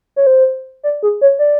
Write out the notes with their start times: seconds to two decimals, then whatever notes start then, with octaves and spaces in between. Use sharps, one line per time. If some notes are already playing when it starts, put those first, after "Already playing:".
0.16 C#5
0.27 C5
0.84 D5
1.03 G#4
1.21 C#5
1.39 D5